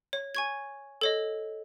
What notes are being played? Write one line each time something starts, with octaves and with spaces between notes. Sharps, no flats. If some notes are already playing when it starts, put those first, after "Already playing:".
C#5
G#5 C#6 G#6
A4 C#5 D#5